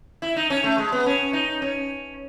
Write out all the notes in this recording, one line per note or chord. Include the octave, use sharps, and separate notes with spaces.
E4
D#4
C#4
A3
G#3
B3
C#4
D#4
C#4